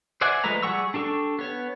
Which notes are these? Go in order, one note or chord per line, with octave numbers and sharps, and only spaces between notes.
C5 D5 E5 F#5 G#5
F3 G#3 A3 B4 A#5
G3 G#4 F#5 C#6 E6
D4 G4 A4 C#6
B3 C#5